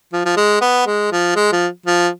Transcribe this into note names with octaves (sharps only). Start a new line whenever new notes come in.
F3
F3
G#3
B3
G#3
F3
G#3
F3
F3